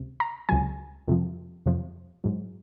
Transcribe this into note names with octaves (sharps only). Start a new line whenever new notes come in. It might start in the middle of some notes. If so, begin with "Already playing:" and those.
Already playing: C#2 C3
A#5
C#2 C3 F#3 G#5
F2 C3 F3
F2 C3 F3
G#2 F#3